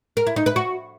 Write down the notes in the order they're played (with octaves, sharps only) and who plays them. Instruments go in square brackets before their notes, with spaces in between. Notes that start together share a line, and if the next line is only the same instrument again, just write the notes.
[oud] A#4
E4
D#4
B4
F#4